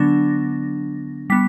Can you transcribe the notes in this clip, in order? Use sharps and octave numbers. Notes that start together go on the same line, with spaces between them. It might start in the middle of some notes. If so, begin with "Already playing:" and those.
Already playing: D3 F#3 B3 D4 A#6
G3 B3 B6